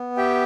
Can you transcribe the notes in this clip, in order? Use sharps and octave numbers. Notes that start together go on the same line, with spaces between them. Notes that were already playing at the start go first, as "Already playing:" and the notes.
Already playing: B3
G4 E5 G5